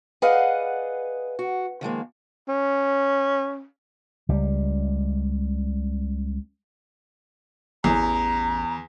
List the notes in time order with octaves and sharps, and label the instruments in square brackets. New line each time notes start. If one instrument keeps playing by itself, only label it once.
[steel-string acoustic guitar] G#4 B4 D5 D#5 F5 F#5
F#4
D#3 F3 G#3 A#3
[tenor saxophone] C#4
[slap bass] C#2 G3
[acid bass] A1 [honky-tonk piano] E2 [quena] A#5